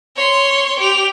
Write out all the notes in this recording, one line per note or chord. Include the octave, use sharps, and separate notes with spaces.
C#5 C6
G4 F7